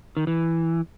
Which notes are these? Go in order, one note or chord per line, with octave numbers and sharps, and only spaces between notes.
D#3
E3